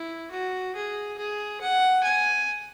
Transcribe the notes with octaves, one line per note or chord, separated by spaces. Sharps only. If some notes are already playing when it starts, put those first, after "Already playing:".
Already playing: E4
F#4
G#4
G#4
F#5
G#5